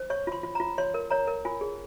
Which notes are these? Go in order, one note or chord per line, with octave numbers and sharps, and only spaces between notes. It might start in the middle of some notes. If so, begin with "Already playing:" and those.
Already playing: C5
C#5 C#6
F4 C6
F4
A#5
F4
C#5 C6
A#4
C#5 A#5
A#4
F4 G#5
G#4